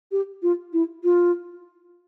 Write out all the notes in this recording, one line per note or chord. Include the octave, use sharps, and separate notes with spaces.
G4
F4
E4
F4